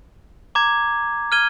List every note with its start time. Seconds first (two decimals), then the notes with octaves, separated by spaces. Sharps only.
0.55 A#5 D6 G#6
1.32 F6 G#6 D#7 G7